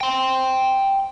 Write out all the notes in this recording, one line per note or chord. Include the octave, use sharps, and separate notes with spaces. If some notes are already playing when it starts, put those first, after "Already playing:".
G5 C6